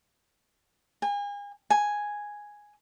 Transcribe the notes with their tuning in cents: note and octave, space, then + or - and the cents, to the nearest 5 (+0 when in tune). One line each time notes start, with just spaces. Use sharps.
G#5 -35
G#5 +0